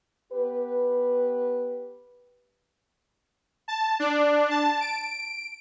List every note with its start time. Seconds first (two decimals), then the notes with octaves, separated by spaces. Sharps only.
0.33 B3 G4 B4
3.68 A5
4.00 D4
4.50 A5
4.81 D7